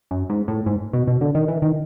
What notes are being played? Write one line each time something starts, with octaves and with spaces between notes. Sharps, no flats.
F#2
G#2
A2
G#2
B2
B2
D3
D#3
E3
D#3